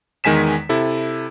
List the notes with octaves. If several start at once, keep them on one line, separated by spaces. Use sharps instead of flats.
E2 D#3 G#3 G#5 B6 E7
C3 E4 A4